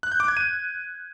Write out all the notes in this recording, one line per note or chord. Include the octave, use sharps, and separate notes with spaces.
F#6
G6
D6
G#6
D#7